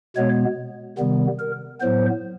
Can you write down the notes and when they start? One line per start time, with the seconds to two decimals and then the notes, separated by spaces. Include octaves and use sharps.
0.16 B2 G#3 B3 C#5
0.98 C3 D#3 G3 B3
1.39 A#4
1.81 A2 F#3 B3 C5